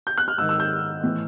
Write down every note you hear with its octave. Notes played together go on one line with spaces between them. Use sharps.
G6
F#6
F6
G#2 D#3 E6
E6
G6
A2 E3